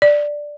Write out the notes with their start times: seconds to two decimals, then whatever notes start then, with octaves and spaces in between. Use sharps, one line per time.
0.02 D5